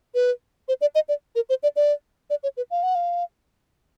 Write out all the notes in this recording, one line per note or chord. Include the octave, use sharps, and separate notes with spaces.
B4
C5
D5
D#5
D5
A#4
C5
D5
D5
D5
C#5
B4
F5
F#5
F5